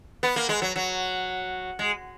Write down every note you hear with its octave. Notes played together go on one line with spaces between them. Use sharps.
B3
A#3
G#3
F#3
F#3
G#3